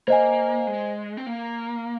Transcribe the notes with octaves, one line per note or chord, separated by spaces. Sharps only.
A#3 C5 D#5 G#5
G#3
C4
A#3